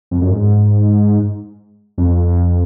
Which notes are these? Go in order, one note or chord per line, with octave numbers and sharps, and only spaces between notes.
F2
F#2
G#2
F2